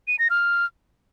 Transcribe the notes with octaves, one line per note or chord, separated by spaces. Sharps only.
D#7
A#6
F6